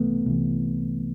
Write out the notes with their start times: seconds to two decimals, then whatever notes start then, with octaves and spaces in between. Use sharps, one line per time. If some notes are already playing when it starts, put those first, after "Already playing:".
Already playing: C2 C3 E3 A3 B3
0.26 C2 C3 E3